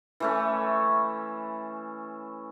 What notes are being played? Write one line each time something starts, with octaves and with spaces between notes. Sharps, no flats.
E3 A3 C#4